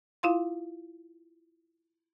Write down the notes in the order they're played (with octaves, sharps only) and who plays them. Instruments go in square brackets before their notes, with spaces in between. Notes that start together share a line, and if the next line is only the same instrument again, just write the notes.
[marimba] E4 F4 F5 C6